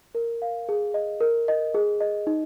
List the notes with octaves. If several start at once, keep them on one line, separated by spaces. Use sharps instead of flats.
A#4
F5
G#4
D#5
A#4
D#5
G#4
D#5
D#4